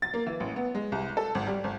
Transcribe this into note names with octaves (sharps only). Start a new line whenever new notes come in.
A6
A#3
E3
A1
B3
G#3
C2
A4
G#1
G3
G#1